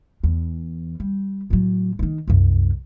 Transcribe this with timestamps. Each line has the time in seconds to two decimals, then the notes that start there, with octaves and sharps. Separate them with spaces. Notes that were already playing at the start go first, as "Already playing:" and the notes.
0.24 E2
1.00 G3
1.50 A2 F#3
1.99 D#3 E3
2.28 C2 F#2